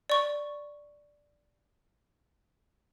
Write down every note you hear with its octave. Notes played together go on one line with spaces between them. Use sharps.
D5 C#6